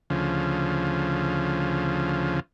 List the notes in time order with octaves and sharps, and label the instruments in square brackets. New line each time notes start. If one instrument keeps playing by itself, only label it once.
[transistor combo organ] D2 C#3 F3